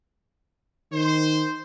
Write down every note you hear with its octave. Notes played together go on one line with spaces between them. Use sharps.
D#3 C5